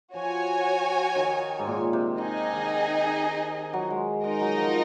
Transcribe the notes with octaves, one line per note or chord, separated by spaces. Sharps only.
F3 F#4 C#5 G#5
D#3
G#2
A#2
C3
D#3 D#4 G#4 D#5 G#5
D#3
F#3
G#3
G#3 D#4 A#4 D#5
F#3
F3